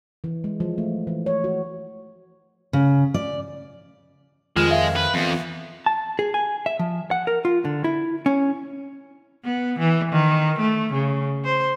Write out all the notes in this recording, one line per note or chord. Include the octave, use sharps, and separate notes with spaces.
E3
G#3
F3
A3
E3
C#5
F#4
C#3
D5
F2 D#3 F3 G#3 F4 F6 E7
E5 F5
B4
F2 E3 B3
A5
G#4
G#5
E5
F3
F#5
A#4
F4
D3
E4
C#4
B3
E3
D#3
A3
C#3
C5